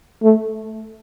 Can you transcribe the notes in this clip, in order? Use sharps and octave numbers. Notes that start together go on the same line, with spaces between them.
A3